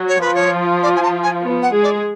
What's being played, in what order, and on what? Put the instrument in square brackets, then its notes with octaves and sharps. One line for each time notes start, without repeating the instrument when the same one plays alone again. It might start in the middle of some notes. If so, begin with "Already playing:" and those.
Already playing: [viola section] F#3
[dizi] C#5
[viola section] F3 F4 [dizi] B4
[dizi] C#5
D5
G#5
A5
G#5
[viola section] B3
[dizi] F#5
[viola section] G#3 G#4
[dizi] D5